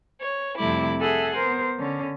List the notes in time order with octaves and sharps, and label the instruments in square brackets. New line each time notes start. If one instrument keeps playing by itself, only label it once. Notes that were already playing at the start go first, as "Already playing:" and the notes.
[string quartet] C#5
F2 C3 G3 A3 E4 D6
G#4 A4 E5 F#5 G#5
B3 A#4 C5
D3 C#4